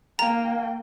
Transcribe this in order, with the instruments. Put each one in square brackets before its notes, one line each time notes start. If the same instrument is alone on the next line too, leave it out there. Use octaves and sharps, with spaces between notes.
[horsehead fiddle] A#3 G5 [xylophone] A#5